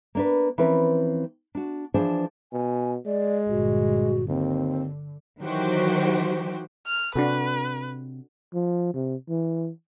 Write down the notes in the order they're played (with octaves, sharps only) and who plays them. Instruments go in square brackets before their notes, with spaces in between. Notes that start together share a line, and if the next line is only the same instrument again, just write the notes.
[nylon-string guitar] A#3 D4 B4
E3 F3 C4 C#4 A#4 B4
D4 F#4
E3 F3 D4 G#4 C5 A5
[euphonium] B2 [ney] G#5
[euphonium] G#3 [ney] D5
[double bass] G1 A#2 [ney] F#4
[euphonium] D#2 [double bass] D3 [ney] C4
[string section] D#3 E3 F#3 F#4 G4 C5
[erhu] F6
[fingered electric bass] C3 [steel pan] D4 F#4 A4 [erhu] B4
[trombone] F3
C3
E3